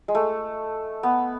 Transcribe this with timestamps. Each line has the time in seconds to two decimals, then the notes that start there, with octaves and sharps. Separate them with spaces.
0.08 G#3
0.15 A3
1.03 B3